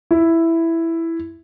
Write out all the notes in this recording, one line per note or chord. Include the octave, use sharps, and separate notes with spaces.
E4